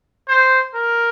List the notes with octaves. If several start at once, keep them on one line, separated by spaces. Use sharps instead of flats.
C5
A#4